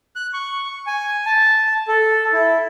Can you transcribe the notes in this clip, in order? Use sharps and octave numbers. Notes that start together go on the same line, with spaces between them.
F#6
C#6
G#5
A5
A4
E4